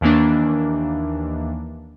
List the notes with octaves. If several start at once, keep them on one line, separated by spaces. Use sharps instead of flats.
D#2 D#3 E3 A#3 D4